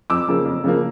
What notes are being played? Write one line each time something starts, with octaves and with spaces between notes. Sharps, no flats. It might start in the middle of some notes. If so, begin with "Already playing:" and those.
F2 D6 E6
C#3 F3 A#3
F2
C#3 F3 A#3